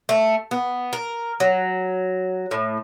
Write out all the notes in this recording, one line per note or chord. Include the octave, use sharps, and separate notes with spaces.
A3
B3
A#4
F#3
A2